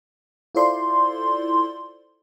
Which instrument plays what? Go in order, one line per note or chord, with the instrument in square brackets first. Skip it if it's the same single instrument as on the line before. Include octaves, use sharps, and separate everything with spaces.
[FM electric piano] E4 F4 A4 C5 D5 C6